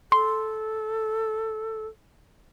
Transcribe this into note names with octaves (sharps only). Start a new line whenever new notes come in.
A4 C6